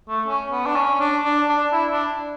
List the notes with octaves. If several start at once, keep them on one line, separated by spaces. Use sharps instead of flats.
A3
C#4
B3
D4
C#4
C#4
D4
D4
D4
E4
D4